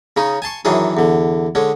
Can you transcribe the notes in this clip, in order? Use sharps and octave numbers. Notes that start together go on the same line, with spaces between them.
C#3 C#4 D#4
G#5 A5 C6 C#6
F#2 D#3 E3 C#4 D4 G#4
E2 D3
D3 G#3 C#4